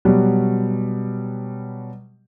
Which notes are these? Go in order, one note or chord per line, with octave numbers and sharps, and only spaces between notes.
B2 F#3 G3